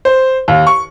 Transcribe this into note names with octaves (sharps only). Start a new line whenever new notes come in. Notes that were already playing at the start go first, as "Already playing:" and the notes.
C5
D#2
C#6